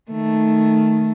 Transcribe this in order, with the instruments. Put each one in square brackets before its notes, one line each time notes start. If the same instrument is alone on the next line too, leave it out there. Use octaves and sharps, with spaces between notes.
[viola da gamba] D#3 A3